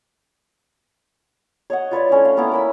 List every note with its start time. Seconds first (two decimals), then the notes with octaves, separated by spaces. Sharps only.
1.70 C#5 D#5 F#5
1.91 F4 B4 C#5 D5
2.09 A3 C#4 D4 E4
2.25 F5
2.37 A#3 B3 C#4 E4
2.52 A#4 B5 E6